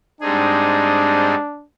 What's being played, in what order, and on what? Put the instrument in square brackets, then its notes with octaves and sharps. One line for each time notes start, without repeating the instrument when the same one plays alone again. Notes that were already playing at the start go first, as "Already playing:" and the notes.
[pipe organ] G#2 G3 C4 D#4 G#4 [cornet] D4